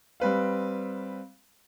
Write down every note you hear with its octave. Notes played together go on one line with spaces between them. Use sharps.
G3 C4 B4 F5